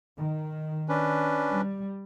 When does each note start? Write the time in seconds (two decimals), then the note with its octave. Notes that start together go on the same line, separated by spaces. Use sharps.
0.18 D#3
0.89 C#4 D4 B4
1.51 G3